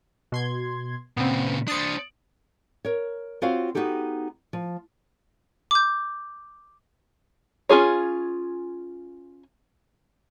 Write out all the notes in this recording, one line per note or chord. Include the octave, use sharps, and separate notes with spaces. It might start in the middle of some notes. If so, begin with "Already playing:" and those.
B2 C6 G#6
A#2 C#3 B3 C4
D4 C5 D#6 A6 C#7
A#4 C#5
C4 F4 F#4 C5 C#5 F5
B3 D#4 F#4 G4 A4
F3
D6 G6
C#4 F4 G#4 C#5